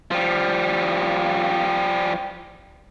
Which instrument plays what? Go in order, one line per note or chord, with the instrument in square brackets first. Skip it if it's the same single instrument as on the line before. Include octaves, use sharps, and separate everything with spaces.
[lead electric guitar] F3 G3